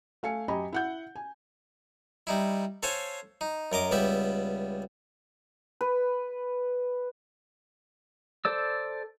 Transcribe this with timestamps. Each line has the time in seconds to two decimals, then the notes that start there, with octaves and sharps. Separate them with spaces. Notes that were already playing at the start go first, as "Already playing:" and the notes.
0.23 A3 F5 G#5 C#7
0.48 F#2 G4 D#5 G#5 A#5 B5
0.73 E4 F#5 G6
1.16 G#5
2.27 G3 D#4 E4
2.83 A4 C5 C#5 F5 G#5
3.41 D#4
3.72 F#2 A#4 D#5 D6
3.91 C#2 G3 B3 G4 E5
5.81 B4
8.45 A4 C5 D5 E6